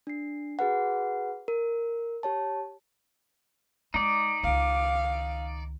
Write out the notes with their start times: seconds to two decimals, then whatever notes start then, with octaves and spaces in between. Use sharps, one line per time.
0.07 D4 C7
0.59 F#4 G#4 B4 F#5
1.48 A#4
2.23 G4 C#5 A5
3.94 G#3 D#4 D5
4.43 C#2 D#3 F5